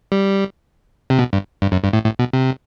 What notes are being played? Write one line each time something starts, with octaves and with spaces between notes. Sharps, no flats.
G3
C3
B2
G2
G2
F#2
G2
A2
A2
B2
C3